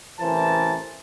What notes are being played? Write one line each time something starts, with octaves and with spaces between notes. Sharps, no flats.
A1 C3 E3 A#4 C5 A5